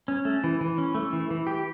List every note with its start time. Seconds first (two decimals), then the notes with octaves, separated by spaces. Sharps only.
0.08 C#4
0.25 A3
0.44 E3
0.61 E3
0.78 C#4
0.95 A3
1.13 E3
1.30 E3
1.47 G4